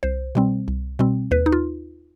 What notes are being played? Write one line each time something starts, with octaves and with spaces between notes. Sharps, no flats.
C2 C5
B2 G3 C4
C2
B2 G3 C4
D#2 B4
D#4
F4